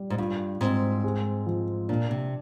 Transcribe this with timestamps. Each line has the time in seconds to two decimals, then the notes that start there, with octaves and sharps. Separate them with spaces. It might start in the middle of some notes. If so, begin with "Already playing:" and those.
Already playing: G3
0.10 G#2
0.18 G2 F4
0.61 G#2 C4
1.04 G#3
1.46 F3
1.89 A#2 D4
2.11 C3